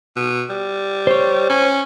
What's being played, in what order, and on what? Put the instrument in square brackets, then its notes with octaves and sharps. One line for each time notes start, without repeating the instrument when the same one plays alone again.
[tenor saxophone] B2
G3
[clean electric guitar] C5 C#5
[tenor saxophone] C#4